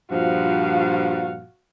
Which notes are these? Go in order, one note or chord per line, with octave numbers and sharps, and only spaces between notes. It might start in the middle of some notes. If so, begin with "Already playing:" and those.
G2 A#2 F3 F#4 F5